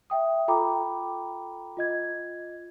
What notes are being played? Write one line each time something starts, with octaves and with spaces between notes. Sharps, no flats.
E5 G5 D#6
F4 A4 G5 A#5 B5 D6
F4 D#5 G#6